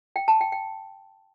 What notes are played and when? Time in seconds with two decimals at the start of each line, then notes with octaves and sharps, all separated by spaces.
0.16 G5
0.28 A5
0.41 G5
0.52 G5